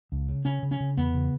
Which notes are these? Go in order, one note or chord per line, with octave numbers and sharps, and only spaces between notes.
C#2
C#3
C#3 C#4
C#3
C#4
C#3
E2 B3
C#3